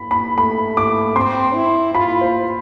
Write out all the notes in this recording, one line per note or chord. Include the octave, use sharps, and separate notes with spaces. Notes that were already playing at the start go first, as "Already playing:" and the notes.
Already playing: B5
B5
A3 B5
D6
C4 C6
E4
F4 B5
C5